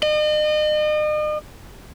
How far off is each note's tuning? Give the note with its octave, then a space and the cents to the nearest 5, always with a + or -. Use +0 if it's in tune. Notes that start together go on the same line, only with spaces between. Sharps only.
D#5 -40